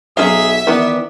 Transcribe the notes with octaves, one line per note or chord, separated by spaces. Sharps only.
B1 F#3 C#4 G#4 E5 F5
D#3 E3 B3 B4 D5